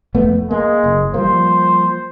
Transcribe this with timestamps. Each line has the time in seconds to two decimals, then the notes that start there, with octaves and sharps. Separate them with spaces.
0.14 F2 A3 B3
0.51 G#3 A#3
0.84 F#1
1.14 F3 G3 A#3 C5